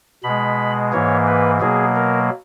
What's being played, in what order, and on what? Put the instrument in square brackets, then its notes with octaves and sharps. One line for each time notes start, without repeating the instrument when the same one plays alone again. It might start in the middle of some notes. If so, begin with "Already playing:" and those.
[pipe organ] B2 G#3 B5
G#2 E3 A#3 C#5
B4
B2 F#3 A#3 G#4
A#4